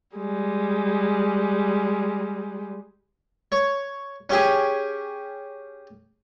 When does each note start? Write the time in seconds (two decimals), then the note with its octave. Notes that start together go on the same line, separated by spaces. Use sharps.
0.16 G3 G#3
3.52 C#5
4.30 C#4 G4 G#4